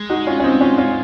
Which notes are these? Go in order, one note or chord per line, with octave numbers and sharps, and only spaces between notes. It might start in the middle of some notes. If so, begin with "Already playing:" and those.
Already playing: G#3
D#4 F#4
C#4 F4
C#4
C4 D#4
C#4 F4
C#4 F4